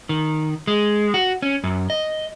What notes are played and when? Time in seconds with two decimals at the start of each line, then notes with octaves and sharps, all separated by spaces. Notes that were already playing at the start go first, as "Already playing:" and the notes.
0.09 D#3
0.67 G#3
1.14 F#4
1.42 C#4
1.64 F#2
1.90 D#5